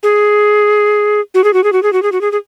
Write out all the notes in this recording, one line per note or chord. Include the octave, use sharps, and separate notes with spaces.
G#4
F#4
G#4
F#4
G#4
F#4
G#4
F#4
G#4
F#4
G#4
G#4